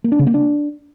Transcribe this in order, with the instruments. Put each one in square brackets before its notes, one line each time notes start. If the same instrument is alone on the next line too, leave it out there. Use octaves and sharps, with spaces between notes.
[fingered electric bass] A#3
D4
C#3
A#3
D4